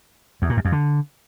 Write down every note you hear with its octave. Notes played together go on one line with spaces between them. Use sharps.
E2
A#2
F#2
F2
D3